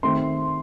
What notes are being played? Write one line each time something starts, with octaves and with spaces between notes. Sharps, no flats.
D#3 A3 C4 C6